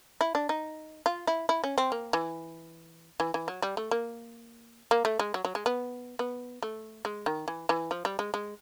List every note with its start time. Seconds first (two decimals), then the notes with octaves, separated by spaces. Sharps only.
0.21 E4
0.35 D4
0.49 D#4
1.06 F4
1.27 E4
1.49 E4
1.64 C#4
1.78 C4
1.92 A#3
2.13 E3
3.20 E3
3.34 E3
3.48 F#3
3.62 G3
3.77 A3
3.91 A#3
4.91 A#3
5.05 A3
5.19 G#3
5.34 F#3
5.45 F#3
5.55 G#3
5.66 B3
6.19 B3
6.63 A3
7.05 G#3
7.26 D#3
7.48 E3
7.69 E3
7.91 F3
8.05 G3
8.19 G#3
8.34 G#3